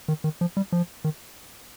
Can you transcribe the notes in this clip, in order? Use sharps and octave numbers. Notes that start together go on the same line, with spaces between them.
D#3
D#3
F3
G3
F3
D#3